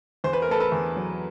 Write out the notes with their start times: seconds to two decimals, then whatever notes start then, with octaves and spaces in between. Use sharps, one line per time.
0.24 E2 C5
0.33 B4
0.42 A#4
0.48 A3 A4 B4
0.60 A4 B4
0.72 E2
0.97 F#3